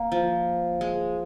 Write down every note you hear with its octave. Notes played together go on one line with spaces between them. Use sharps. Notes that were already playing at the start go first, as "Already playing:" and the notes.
Already playing: A#3
F3
G#3